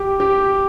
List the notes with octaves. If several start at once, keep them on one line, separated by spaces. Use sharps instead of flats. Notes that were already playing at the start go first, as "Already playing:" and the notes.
Already playing: G4
G4